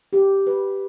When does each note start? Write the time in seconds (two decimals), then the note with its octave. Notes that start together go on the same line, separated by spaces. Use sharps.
0.13 G4
0.47 B4